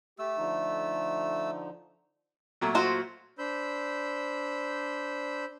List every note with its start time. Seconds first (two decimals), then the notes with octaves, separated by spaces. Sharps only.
0.19 A3 G4 E6
0.37 D3 F3 D#4
2.61 A#2 F#3 A3
2.75 F4 F#4 C5
3.38 D4 C5 B5 E6 G6